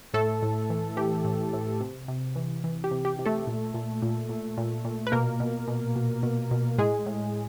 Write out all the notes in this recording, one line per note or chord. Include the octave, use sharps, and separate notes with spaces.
A2 A3 A4
A2
E3
E3 G4
A2
A2
C3
C3
E3
E3
G4
C3
G4
C3
A3 A4
A#2
A#2
A#2
A#2
A#2
A#2
B4
B2 A#3 A#4
B2
B2
B2
B2
B2
A2 G#3 G#4
A2